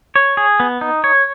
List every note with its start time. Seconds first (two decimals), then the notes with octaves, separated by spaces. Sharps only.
0.16 C#5
0.37 G#4
0.60 B3
0.81 D#4
1.04 C#5